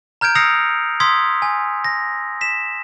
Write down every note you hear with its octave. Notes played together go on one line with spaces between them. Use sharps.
A#5 F6 G6 G#6 D7
D#6 E6 A#6 C7 C#7 F7
C6 D#6 E6 G#6 B6
G#5
A#6
B6 E7